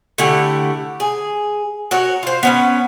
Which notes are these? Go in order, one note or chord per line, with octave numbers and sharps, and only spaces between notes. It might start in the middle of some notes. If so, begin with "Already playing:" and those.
D3 A3 E4 G4
G#4
F#4 A#4 C#5
F4 C5
B3 C#4 B4